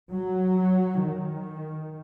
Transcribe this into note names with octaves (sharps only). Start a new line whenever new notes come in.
F#3
D#3